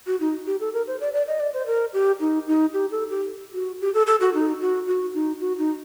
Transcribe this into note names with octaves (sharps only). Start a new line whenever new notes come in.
F#4
D#4
G4
A4
A#4
C5
D5
D5
D#5
D5
C5
A#4
G4
D#4
D#4
G4
A4
G4
F#4
G4
A4
A4
F#4
D#4
F#4
F#4
D#4
F#4
D#4